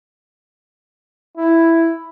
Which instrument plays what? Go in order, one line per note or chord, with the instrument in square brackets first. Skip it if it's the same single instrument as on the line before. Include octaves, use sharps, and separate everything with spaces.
[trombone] E4